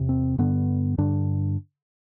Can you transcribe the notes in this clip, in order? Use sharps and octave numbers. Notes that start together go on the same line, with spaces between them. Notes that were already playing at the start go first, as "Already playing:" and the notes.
Already playing: E2 C3
C4
G2 D3 B3
G2 D3 D4